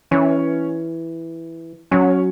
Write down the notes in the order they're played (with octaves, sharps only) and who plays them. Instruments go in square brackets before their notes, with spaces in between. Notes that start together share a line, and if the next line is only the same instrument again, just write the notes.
[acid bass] E3 [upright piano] C#4 C#5
[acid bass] F#3 [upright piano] C#4 C#5